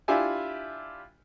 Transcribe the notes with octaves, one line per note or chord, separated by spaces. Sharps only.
D4 E4 F4 G4 E5 G#5